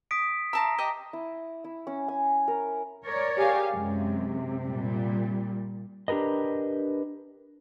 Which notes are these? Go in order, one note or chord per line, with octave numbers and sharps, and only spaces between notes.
D#6 B6 D7
E5 A5 A#5 C6 A#6
G4 D#5 D#6
E4
E4
C#4
G#5
A#4
A#4 C#5 D5
G4 G#4 F5
F#2 C3 G#3
A#2 G3
D4 G4 A#4 B4 D#5